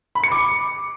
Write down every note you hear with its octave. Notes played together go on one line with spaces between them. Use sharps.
B5
C#7
D6